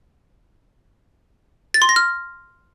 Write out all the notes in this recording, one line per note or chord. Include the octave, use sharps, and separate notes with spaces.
A6
C6
A#6
F6